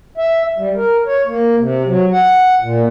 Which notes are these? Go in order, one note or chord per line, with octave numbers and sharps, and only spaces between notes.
E5
G3
A#4
C#5
A#3
C3
F#3
F#5
A#2